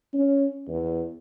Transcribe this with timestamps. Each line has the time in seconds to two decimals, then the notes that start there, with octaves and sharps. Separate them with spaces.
0.13 C#4
0.68 E2